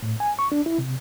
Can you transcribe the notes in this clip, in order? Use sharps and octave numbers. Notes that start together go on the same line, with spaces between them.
A2
G#5
C#6
D4
E4
C3